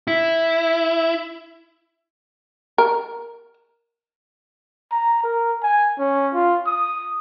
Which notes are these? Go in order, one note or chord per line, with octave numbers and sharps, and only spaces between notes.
E4
A#4
A#5
A#4
G#5
C#4
F4
D#6